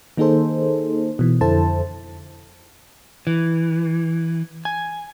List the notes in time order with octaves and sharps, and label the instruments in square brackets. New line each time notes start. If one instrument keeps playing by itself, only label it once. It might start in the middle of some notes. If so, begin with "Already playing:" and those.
[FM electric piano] D#3 A#3 D#4 G#4 A4 C5
B2 E3
F2 D3 E4 A4 C5 A5
[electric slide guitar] E3
G#5